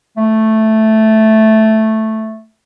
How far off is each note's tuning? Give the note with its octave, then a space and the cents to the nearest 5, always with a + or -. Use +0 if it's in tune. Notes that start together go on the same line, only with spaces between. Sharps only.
A3 +0